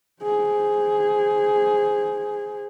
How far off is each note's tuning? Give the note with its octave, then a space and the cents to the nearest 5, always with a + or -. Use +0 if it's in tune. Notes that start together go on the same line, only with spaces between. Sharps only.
G#4 +0 C5 +0